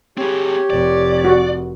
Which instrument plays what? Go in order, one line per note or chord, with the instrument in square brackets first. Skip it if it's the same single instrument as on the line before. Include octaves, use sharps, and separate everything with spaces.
[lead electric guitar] C4 G#4 [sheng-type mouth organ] G4 C#5
[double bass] F1 [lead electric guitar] D5
[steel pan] F#4